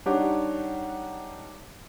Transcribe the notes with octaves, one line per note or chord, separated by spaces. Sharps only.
G3 D4 D#4 G4 C#5 F#5